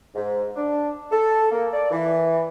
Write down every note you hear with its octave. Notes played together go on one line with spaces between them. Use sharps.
G#2
D4
A4
A#3
D5
E3